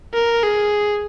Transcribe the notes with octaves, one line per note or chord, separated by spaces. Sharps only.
A#4
G#4